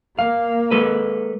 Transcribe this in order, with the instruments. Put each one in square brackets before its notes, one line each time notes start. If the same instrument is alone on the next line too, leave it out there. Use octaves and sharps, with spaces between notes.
[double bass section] A#3 [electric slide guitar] F5
[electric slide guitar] G#3 A4 B4